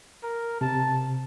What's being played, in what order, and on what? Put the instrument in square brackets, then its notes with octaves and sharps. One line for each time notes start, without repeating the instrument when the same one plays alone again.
[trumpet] A#4
[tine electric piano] C3 [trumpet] A5